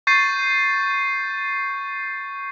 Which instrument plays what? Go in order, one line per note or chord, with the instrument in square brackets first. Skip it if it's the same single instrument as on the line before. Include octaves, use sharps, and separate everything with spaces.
[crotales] C#6 G6 A6 C7 D#7